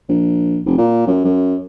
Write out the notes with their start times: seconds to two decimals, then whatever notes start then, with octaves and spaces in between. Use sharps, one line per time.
0.09 A#1
0.65 F1
0.78 A#2
1.07 F#2
1.24 F#2